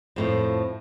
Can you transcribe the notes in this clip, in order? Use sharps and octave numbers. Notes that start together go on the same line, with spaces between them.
F2 A2 F3